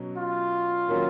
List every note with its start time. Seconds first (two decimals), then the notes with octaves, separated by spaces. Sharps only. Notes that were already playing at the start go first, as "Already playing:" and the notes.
Already playing: B2 F#3 C#4
0.17 F4
0.88 D#3 F#3 A#3 C#4